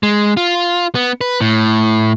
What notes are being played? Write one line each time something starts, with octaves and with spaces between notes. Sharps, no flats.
G#3
F4
B3
B4
A2